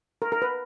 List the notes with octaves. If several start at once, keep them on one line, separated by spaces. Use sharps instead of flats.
A#4
A#4
B4